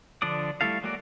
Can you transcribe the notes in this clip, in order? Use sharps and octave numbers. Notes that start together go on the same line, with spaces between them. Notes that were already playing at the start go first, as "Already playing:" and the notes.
D3 F3 D4 D5 D#6
G3 A3 E4 A4 F5
F#3 G#3 A#3 F#4 D5